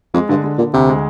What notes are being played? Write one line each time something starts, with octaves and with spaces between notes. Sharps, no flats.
F2 G#3
G2 D3
D3
A#2 D3
D2 C3
G#3